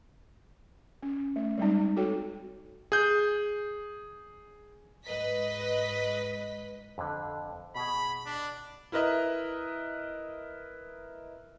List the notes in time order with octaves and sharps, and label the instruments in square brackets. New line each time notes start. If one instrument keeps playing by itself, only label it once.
[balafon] C#4
A3
G3 G#3 C4 D#4
F#4 A4 C#5 G5
[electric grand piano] G#4 G6
[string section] G#2 B4 D#5 B6
[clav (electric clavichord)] F2 D3
[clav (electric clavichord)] B2 G#4 [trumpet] B5
[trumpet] D4
[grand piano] E4 A#4 B4 D#5 E5